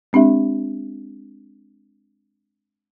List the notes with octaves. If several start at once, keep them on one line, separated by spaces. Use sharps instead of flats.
G#3 C4 D4 G4 E5